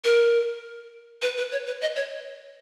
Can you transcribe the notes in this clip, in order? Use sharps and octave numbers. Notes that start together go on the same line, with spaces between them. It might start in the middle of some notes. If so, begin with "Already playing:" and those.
A#4
B4
B4
C#5
B4
D#5
C#5